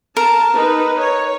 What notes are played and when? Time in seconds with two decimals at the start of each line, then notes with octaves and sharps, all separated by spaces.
0.17 A#4 A5
0.55 D#4 B4
1.00 C#5